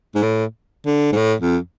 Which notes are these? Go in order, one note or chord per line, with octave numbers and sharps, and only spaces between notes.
G#2
A2
D3
G#2
A2
F2